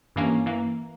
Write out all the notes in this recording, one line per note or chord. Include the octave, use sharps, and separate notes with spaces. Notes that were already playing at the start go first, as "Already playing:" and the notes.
G2 E3 A#3 C#4
E3 A#3